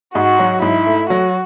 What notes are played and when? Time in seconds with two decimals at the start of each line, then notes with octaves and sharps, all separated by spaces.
0.14 G#2 F#4
0.39 F#3
0.62 G#2 E4
0.87 A3
1.10 F#3 F#4